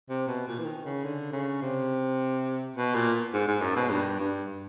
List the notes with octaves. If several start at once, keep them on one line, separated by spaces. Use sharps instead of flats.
C3
B2
A#2
E3
D#3
C#3
D3
C#3
C3
B2
A#2
G#2
G#2
F#2
B2
G2
G2